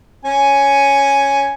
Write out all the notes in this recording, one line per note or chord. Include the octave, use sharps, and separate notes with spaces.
C#4 G#5